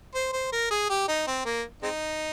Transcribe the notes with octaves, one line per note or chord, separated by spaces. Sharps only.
C5
C5
A#4
G#4
G4
D#4
C4
A#3
G#3 C4 D#4